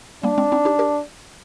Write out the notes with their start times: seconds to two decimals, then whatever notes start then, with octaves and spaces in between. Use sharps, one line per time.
0.23 G3 A#3 D4
0.38 G#3 C4
0.52 C4 D#4
0.65 D#4 G4
0.79 G4 A#4